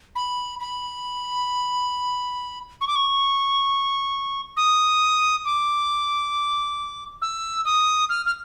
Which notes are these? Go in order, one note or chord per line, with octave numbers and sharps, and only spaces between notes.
B5
B5
C#6
D6
C#6
D#6
D6
E6
D#6
F6
F6